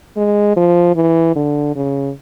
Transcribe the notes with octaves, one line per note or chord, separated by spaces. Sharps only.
G#3
F3
E3
D3
C#3